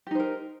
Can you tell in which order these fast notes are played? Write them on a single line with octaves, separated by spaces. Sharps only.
G4 D#4 C5 A#4